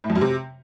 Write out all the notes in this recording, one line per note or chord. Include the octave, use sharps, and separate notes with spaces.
A2
F2
F#2
C3